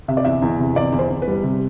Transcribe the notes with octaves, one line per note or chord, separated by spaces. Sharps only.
C3 E5
D5
E2 E5
E2
C3
E2 D5
E2
C5
E2
B4
G3
C3